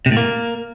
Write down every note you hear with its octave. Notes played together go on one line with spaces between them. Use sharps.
C3
A2
A#3